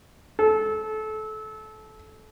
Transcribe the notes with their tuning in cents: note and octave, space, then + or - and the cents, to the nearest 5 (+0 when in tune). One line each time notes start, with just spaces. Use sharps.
A4 -25